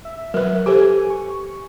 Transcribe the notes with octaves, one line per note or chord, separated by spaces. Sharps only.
E5
F#3 A#4 B4
G4 A4 C5 G#5
C#6